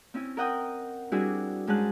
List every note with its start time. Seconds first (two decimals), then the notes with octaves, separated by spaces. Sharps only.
0.14 C4 C#4 E4
0.37 A#4 D#5 F#5 G5 D#6 G6
1.12 G3 C4 D4 E4 F#4 G#4
1.67 G#2 G#3 C#4 G#4 A5 F#6